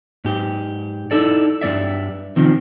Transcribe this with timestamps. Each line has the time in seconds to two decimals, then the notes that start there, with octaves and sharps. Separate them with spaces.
0.24 G#2 G4
1.11 D#4 E4 A4 D5
1.61 G2 G#3 D5 E5
2.36 C3 D#3 F3